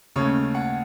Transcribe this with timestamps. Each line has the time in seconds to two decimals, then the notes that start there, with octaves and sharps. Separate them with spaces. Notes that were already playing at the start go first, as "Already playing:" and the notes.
0.16 D#2 C#3 A3 C#5
0.55 F#5